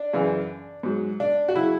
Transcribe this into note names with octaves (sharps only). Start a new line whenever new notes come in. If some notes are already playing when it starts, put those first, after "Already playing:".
Already playing: D4
F#2 C#3 E3
G#2 F#3
D4
F#4
C#3 F#3 E4